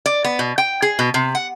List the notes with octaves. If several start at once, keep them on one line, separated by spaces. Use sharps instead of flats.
D5
B3
B2
G5
G#4
B2
C3
F#5